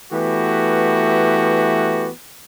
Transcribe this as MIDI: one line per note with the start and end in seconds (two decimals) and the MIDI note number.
0.12 2.10 52
0.12 2.10 57
0.12 2.10 59
0.12 2.10 66
0.12 2.10 67